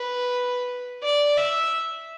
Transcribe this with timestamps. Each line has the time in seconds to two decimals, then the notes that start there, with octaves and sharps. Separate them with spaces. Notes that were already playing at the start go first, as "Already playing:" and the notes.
Already playing: B4
1.03 D5
1.38 E5